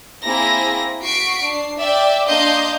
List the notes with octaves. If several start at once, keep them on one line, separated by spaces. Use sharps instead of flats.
A#3 C4 E4 G#4 A#6
F#4 C#6 B6 C7 D7
D4 C7
D5 E5 G5
A#3 D4 D#5 F5 C6 G6